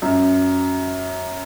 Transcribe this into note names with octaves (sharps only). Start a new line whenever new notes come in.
F#2